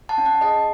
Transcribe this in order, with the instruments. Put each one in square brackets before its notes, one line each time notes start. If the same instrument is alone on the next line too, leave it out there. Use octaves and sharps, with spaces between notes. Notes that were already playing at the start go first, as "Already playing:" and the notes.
[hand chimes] F#5 A5
C#4
F#5 A5
G#4 D#5 F#5